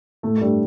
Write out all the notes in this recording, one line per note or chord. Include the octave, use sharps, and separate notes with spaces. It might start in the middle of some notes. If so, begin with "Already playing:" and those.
A2 A3
A3
G2 G3